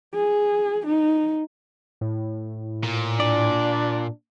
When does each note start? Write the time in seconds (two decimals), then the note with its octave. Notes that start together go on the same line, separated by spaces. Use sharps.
0.14 G#4
0.86 D#4
2.01 A2
2.84 A#2
3.20 D4 D5